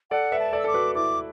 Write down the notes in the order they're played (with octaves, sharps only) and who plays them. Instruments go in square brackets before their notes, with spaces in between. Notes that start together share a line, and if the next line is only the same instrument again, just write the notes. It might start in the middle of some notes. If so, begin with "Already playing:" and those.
[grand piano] A4 D5 [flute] F#5
[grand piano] B4 E5
[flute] A5
[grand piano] A4 D5
[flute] E6
[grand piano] A4 [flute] D6
[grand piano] F#4 B4
[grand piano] E4 A4 [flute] D6